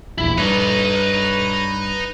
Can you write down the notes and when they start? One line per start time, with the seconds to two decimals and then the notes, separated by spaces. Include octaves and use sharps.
0.18 D1 A#1 E2 E4
0.38 G2 D#4 B4 C#5